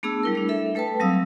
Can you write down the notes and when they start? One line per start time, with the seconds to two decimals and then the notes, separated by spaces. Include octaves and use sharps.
0.03 A3 B3 D4 G#4 A5 E6
0.23 G3 E4 A#4
0.35 A3 D4
0.49 A4 E5
0.75 A3 A4 B4 G5 A5
1.00 F#3 G3 C4 F5 D#6 E6